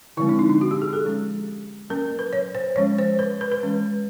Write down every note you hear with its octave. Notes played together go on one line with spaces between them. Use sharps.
D3 F3 G#3 C4 E4
D4
D#4
D#4
F#4
G4
G#4
A4
F3 G#3 C#4
F#3 A#3 C#4 A#4
B4
C#5
C5
F3 G#3 C#4 C#5
C5
B4
B4
B4
E3 G#3 C#4